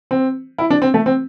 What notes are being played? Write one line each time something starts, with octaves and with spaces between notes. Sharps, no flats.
C4
E4
D4
C4
A3
C4